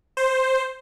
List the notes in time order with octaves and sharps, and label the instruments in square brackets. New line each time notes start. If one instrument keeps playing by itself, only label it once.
[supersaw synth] C5